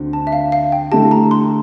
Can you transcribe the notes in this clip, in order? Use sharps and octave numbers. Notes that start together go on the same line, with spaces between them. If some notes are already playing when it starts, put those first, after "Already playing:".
Already playing: D2 D3 C4
A5
E5
F5
F5
G5
D3 A3 E4 G4 A5
A#5
C6